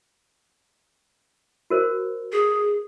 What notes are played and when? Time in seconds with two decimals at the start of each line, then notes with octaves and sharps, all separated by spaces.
1.70 F#4 A#4 C5
2.32 G#4